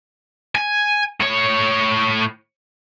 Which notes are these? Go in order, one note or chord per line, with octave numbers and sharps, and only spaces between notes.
G#5
A2 C#5